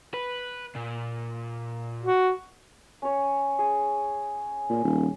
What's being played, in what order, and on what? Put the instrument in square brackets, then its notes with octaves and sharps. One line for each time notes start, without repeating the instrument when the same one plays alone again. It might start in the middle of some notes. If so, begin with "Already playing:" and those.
[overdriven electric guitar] B4
A#2
[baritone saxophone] F#4
[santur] C#4 C#5
G#4
[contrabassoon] A#2
D#1